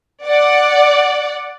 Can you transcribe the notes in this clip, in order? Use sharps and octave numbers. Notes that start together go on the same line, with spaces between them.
D5 F#5